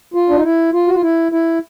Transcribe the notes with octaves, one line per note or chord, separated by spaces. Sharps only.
F4
D4
D#4
E4
F4
F#4
F4
E4
E4